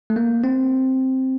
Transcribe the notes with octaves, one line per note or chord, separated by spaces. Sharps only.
A3
A#3
C4